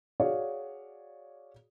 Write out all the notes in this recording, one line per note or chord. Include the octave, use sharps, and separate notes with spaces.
F#4 G#4 C#5 D5 F5